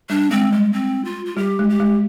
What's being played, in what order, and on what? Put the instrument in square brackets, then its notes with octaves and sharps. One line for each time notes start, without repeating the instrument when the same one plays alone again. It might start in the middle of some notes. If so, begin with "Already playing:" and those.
[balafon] G3 [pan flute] D4
[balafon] G#3 [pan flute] C4
[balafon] G3 [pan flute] G#3
[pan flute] C4
F4
F4
[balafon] G3 [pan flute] G4
[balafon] G#3
[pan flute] G4
[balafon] G#3